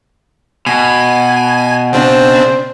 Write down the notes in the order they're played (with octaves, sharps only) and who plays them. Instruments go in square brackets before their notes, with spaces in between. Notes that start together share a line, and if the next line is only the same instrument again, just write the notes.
[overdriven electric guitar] B2 [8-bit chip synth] G#5
[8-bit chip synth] C#3 C4 D4 [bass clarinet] C5